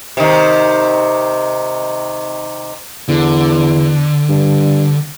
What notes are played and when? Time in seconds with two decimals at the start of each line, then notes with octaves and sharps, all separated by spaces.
0.17 C3 D#3
3.08 E2 D3
4.29 G2